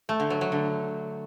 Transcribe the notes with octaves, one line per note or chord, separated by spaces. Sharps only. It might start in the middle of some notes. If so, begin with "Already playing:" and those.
A3
D3
F#3
F#3
D3